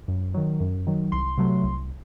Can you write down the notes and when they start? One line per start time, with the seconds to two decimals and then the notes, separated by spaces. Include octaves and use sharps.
0.08 F#2
0.34 D#3 F#3
0.60 F#2
0.87 D#3 F#3
1.12 C2 C6
1.38 C3 F#3 A3
1.63 C2